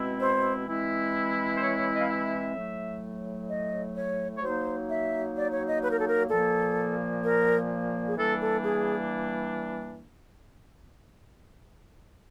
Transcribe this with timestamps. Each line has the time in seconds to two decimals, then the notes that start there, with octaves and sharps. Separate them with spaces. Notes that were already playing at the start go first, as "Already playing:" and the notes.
Already playing: B2 G#3 C4 E4
0.21 C5
0.68 E3 G#3 C4 E4
1.57 C5
1.62 C#5
1.77 C#5
1.93 D#5
2.00 F5
2.08 E5
2.55 A2 F#3 A3
3.49 D#5
3.96 C#5
4.36 C#5
4.43 F#3 A#3 D#4 C5
4.89 E5
5.36 D5
5.52 C#5
5.67 D#5
5.82 B4
5.91 A#4
6.00 A4
6.08 A#4
6.30 A#2 F3 A#3 A4
7.23 A#4
8.07 G#4
8.17 E3 G3 A#3 D4 A4
8.41 A4
8.64 G#4